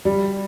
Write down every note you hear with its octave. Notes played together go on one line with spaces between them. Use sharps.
G3